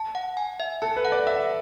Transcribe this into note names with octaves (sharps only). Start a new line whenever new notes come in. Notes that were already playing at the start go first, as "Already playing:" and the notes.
Already playing: A5
F#5
G#5
E5
A4 A5
B4
F#5
D5
E5 F#5